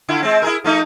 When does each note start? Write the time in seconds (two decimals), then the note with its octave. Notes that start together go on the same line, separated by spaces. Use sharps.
0.09 D3 E4 F4
0.23 G#3 C4
0.42 E4 G#4 A#4
0.64 F3 A3 D#4